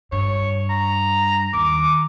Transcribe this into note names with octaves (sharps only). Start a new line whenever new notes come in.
G2 C#5
A#5
D#2 D6